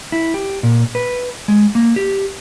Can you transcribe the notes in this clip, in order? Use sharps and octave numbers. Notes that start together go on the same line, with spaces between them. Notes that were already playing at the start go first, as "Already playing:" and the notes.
E4
G4
A#2
B4
G#3
A#3
G4